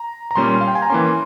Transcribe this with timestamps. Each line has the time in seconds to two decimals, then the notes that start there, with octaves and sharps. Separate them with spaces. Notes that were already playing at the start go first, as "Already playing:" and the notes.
Already playing: A#5
0.31 A#5
0.36 A#2 G3 A#3 C#4 C6
0.61 F5
0.68 G5
0.75 G#5
0.82 A#5
0.90 E3 A#3 C#4 C6